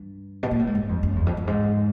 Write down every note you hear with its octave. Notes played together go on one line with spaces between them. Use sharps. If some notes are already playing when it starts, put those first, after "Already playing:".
Already playing: G2
B2
A#2
A2
G#2
G2
F2
F#2
E2
F2
F#2
G#2